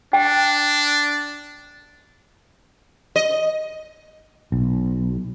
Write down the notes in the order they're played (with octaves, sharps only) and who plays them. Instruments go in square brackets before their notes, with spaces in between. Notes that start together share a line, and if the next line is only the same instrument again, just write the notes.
[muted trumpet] D4 [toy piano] G5
[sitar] D#5
[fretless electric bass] B1